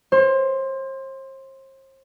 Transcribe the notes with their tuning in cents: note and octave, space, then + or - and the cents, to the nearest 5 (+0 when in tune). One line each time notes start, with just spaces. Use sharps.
C5 +40 C6 +5